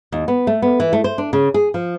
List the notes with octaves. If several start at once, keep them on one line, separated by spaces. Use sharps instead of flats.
D#2
B3
A3
B3
E3
A3
C5
D4
C#3
G#4
F3